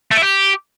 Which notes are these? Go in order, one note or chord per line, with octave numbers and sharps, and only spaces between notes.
A3
E4
G4